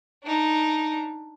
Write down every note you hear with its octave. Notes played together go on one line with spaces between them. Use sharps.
D4 D#4